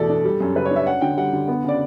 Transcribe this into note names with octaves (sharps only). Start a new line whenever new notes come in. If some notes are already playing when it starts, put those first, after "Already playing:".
Already playing: E2 B2 A3 A4 D5
D4
G3
F#2
C#3 B4
C#5
D4
E5
C#4 F#5
D3 G5
G3 F#5
D3
B3
C#3 D5